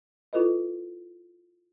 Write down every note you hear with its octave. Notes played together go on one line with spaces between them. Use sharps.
E4 F4 A4 B4 D#5